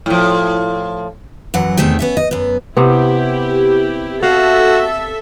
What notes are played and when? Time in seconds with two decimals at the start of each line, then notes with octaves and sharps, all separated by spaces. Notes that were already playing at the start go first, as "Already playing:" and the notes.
0.06 A2 F3
1.54 F#2 E3 F#3 F#5
1.77 E2 C3 D#3 A3 G#4 G5
1.99 B3 C#4 E5
2.17 D#5
2.31 F#2 B3
2.77 C3 B3 E4 G4
4.23 F#4 A4 E5 F5